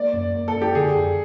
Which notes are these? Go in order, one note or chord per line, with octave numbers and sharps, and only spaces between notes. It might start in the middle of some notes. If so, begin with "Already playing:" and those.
Already playing: A#3 D5
F#2
A#3
A4
F#2
G4
D3 G#4
F2